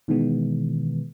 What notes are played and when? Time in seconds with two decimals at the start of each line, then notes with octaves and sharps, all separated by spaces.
0.08 B2 D#3 E3 G#3 B3